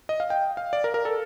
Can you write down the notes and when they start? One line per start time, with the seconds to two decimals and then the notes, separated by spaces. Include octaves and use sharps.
0.09 D#5
0.20 F5
0.30 G5
0.57 F5
0.73 D5
0.84 A#4
0.94 A#4
1.05 A4